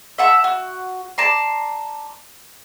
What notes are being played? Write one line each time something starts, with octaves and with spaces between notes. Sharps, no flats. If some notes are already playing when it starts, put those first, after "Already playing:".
E5 F#5 A5
F#4
D5 A5 A#5 C6